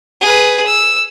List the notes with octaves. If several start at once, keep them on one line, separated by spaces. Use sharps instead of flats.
G#4 B4
E6